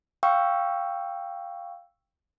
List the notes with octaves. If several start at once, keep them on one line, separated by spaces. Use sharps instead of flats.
F5 G5 C#6 E6